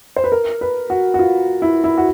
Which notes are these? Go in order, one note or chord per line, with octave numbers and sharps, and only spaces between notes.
C5
B4
A#4
B4
F#4
F#4
F4
E4
E4
F#4